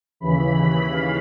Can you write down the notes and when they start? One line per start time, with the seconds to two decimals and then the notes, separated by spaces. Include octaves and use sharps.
0.20 D#2 C#3 E3 B5
0.90 F5